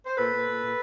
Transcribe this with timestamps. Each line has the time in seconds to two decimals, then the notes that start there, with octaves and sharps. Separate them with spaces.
0.06 C5
0.17 A#2 A4 B4
0.32 A#2
0.47 A#2
0.62 A#2